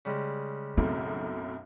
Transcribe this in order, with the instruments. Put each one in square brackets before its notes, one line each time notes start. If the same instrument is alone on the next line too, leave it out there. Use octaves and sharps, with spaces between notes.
[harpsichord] C#3 G3 G#3
[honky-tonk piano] B1 F#2 A2 [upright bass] C4